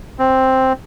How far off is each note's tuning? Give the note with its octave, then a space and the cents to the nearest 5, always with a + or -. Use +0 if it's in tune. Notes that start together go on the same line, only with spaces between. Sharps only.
C4 +5